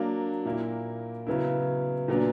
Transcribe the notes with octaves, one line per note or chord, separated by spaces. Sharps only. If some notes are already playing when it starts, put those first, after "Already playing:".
Already playing: F#3 A#3 D4
A#2 A#3 E4
C#3 F#3 B3 E4
A#2 F#3 B3 D4